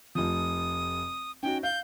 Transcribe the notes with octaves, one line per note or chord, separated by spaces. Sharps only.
F1 F3 D#6
C#4 D#4 F#4 G5
F5 G6